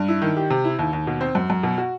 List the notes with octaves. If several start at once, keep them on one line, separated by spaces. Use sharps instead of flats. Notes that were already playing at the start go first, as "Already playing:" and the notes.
Already playing: G2
E4
D#3
G4
C3
E4
D#2
D#2
B2
C4
F#2
F#2
B2
F#4